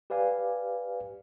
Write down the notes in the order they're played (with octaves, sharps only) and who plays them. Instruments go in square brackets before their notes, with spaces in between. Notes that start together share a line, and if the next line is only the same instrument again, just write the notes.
[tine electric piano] G4 B4 D5 F5 G#5